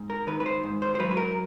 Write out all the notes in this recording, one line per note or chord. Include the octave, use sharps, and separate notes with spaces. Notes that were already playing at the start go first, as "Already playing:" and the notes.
Already playing: G#2
A#4
D#3 B4
B4
C5
G#2
C5
C5
F#3 B4
B4
A#4